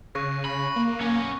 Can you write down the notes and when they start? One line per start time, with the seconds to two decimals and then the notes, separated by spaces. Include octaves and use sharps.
0.15 C#3 C#6 F#6 A#6
0.45 B5
0.76 A#3
1.01 B3 C#4